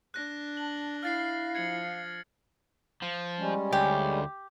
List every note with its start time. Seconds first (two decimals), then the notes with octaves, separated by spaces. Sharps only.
0.14 D4 F#6 A#6
0.57 A5 F#7
1.03 E4 F5 F6 A6 C7
1.55 F3 G#6 C#7 F#7
3.03 F3
3.38 G3 G#3 C#4
3.73 D2 G4